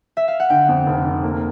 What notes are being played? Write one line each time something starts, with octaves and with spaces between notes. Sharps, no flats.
E5
F5
F#5
D3 G5
F2
F1
F1
A#3